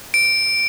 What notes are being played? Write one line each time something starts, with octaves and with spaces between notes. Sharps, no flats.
D7